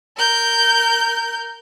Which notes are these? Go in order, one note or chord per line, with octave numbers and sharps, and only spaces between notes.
A#4 G6